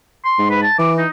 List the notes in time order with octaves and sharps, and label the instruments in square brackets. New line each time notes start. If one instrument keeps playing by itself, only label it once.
[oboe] C6
[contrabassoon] G#2
[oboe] B4
A5
[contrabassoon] E3 [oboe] D6
[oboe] D#4